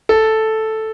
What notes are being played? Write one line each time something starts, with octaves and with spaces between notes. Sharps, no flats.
A4